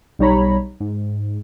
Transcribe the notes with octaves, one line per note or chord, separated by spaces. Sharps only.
B1 G3 D#4 C#5 A#5 B5
G#2